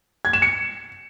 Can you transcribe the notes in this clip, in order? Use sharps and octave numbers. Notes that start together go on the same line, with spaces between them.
G#6
E7
C#7